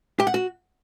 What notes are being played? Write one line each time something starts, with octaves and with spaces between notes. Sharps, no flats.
G4
F#5
F#4